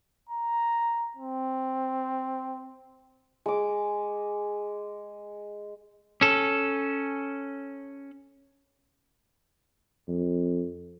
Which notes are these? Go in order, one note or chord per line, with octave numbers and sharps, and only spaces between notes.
A#5
C4
G#3 D6
C#4 A4
F2